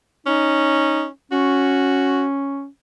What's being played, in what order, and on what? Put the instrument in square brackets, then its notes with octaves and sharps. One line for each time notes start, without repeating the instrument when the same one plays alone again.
[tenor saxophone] C#4 [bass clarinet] D#4
[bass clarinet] C#4 [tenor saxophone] F#4